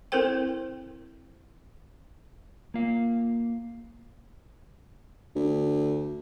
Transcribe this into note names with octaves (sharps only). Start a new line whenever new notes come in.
C4 E4 A4 A#4 C5 G5
A#3 F4 F5
D2